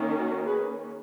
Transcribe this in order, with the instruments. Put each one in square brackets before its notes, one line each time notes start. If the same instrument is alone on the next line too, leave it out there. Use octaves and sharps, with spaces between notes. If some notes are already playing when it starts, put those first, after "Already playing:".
Already playing: [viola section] D#3 A#3 C#4
F#4 A#4
G#4 B4